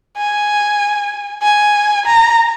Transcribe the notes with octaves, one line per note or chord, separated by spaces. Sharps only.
G#5
G#5
A#5